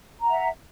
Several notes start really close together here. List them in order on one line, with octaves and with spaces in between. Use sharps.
A#5 F#5 E5